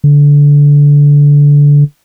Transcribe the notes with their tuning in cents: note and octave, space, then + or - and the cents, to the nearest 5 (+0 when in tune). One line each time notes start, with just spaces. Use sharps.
D3 -20